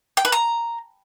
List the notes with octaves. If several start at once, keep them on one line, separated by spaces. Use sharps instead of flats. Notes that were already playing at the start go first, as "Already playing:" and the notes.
G5
B4
A#5